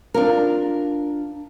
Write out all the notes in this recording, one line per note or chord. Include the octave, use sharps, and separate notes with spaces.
D4 F4 A#4